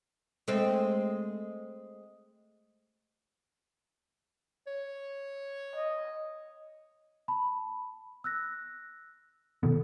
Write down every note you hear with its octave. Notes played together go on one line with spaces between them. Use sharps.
G#3 A3 C4
C#5
D#5
A5 B5
E6 F#6 A#6
B2 D#3 B3 A4